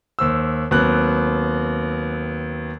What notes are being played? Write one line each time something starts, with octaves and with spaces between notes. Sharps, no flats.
D#2 C5 E6
D#2 F#3 B3 C4 F#6